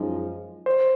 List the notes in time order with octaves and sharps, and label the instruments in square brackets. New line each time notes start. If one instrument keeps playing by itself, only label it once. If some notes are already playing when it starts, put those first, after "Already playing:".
Already playing: [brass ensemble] F#2 F3 G#3 D#4
[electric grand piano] C5